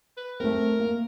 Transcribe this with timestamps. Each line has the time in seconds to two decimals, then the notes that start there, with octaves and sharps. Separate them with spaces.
0.17 B4
0.40 A3 C4 A#4
0.79 A#3